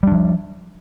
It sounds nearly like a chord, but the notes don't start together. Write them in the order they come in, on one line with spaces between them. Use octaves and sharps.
G3 D4 F3